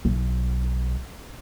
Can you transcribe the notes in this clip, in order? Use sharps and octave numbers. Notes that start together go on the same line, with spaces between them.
B1